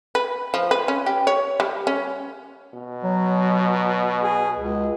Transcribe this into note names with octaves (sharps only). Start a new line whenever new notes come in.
B4
F3
B4
C#4
G4
C#5
G3
C#4
B2
F#3
G#4
C#2